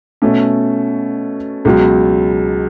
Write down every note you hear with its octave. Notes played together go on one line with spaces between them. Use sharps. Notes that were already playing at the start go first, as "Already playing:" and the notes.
B2 A3 C#4
C#2 B2 F#3